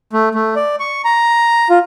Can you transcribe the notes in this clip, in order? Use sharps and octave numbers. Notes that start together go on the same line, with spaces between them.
A3
A3
D5
C#6
A#5
F4